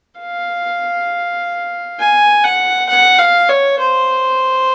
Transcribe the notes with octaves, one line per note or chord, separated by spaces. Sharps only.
F5
G#5
F#5
F#5
F5
C#5
C5